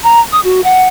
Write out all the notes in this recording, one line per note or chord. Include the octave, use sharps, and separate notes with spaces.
A#5
D#6
F#4
F#5